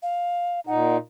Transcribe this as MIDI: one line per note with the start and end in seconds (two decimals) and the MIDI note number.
0.03 0.60 77
0.67 0.97 46
0.67 0.97 63
0.67 0.96 78